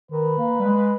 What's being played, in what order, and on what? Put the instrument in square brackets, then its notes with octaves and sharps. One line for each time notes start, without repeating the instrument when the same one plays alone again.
[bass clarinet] D#3 [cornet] B4
[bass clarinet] A#3
G3
G#3